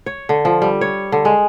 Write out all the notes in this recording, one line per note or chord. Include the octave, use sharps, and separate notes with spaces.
C#5
D3
F3
G3
C#5
D3
G#3